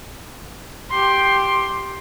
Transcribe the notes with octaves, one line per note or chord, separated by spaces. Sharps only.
G4 C6